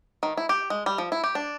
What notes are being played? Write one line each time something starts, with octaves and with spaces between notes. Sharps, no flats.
D#3
E4
G4
G#3
G3
F3
E4
G4
D4